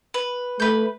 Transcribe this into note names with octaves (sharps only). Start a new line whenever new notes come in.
B4
A3 B4 G6